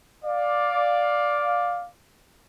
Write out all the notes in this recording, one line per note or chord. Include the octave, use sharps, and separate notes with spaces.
D5 F5